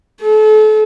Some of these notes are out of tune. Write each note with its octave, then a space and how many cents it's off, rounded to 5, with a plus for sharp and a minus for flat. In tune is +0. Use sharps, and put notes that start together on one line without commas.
A4 -35